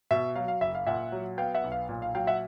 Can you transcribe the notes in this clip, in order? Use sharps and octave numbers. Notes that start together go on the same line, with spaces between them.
B2 E5
F#3 F5
F5
F#1 E5
F5
A#2 E5 F#5
F#3
B3 F5 G5
E5 F#5
B1
F5
A#2
F5
F#3 F5 G5
E5 F#5